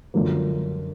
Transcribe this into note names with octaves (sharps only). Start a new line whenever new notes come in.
F#2 D3 F3 A#3